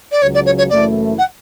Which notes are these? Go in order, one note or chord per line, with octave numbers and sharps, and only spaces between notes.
D5
C#2 C#3 F#3 C#5
D5
C#5
C#5
F#1 F#2 E3 A3 E4 D5
F#5